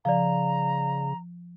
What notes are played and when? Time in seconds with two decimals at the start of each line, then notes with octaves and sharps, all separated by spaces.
0.05 C#3 F3 D5 F5 A#5